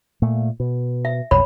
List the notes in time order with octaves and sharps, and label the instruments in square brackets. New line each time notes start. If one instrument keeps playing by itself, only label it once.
[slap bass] A#2 A3
B2
[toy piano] E5
[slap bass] B1 F2 [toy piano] C#5 B5